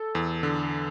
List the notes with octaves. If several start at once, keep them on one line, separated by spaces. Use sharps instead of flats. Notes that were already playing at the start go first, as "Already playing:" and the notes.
Already playing: A4
E2
D3